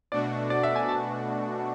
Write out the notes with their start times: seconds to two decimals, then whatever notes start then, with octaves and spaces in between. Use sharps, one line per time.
0.12 B2 A3 D4 F#4 D5
0.50 D5
0.63 E5
0.76 G#5
0.89 A5